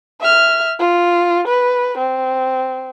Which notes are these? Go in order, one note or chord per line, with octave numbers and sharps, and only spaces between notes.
E5 F6
F4
B4
C4